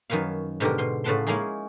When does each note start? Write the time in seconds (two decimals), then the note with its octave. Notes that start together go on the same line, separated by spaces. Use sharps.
0.10 F#2 D#3 B4 C#5 F5
0.60 G#2 B2 D3 G4 A#4
0.78 B2 C6
1.04 A2 C#3 B4 F#5 A5 C6
1.27 G#3 A#3 C#4 D#4 E4 G#4